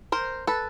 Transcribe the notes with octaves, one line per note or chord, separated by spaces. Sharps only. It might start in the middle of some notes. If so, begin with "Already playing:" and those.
A#4 C5
A4 B4